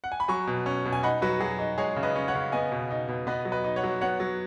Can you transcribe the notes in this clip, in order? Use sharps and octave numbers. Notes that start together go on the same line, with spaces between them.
F#5
G#5
B5
F#3 G#5 C#6
B2
C#4
B2
G#5
D#4 F#5 B5
F#3 F#4 B4
F#3 G#4
D#4
G#3 G#4 C#5
C#3
B4 D#5
C#4
C#5 F#5
C#3
B3 D#5 G#5
B2
D#4
B2
B3 B4 D#5
F#3
B4 D#5
D#4
C#5 F#5
F#3
B3 C#5 F#5
F#3